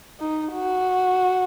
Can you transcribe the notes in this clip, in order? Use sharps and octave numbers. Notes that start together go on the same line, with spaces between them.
D#4
F#4